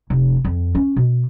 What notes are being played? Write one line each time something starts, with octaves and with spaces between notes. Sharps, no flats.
F1
F2
C#4
B2